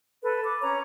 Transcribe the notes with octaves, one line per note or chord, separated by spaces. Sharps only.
A4 B4
D6
C#4 C#5 A#5